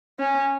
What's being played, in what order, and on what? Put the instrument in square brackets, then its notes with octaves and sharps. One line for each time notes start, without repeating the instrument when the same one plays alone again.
[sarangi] C#4